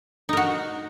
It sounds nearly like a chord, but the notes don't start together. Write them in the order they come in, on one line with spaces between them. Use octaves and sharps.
D#4 A#4 F#4